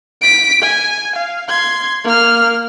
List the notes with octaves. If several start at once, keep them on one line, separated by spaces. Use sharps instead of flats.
B6 D7
G#5
F5
C6 G#6
A#3 F6